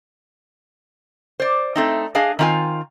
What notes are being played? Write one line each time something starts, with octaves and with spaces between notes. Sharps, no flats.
C5 D5
A3 C4 D#4
D4 G#4 D#5 F5 G#5
D#3 C4 F4 F5 G#5